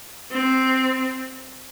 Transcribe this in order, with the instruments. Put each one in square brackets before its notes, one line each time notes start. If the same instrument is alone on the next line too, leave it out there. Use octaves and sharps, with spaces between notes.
[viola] C4